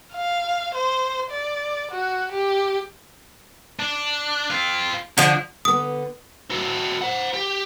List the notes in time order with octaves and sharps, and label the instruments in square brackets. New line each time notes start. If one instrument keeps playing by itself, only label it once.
[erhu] F5
C5
D5
F#4
G4
[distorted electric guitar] D4
C4 F4
[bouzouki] D3 F3 [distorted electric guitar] D4
[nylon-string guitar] D3 B3 [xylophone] D#6
[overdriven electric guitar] C4 F#4
C5 F#5
G4